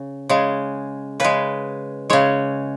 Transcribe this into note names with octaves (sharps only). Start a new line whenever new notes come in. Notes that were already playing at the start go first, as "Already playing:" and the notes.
Already playing: C#3
C#3 G#3
C#3 G#3 B4
C#3 G#3 C#5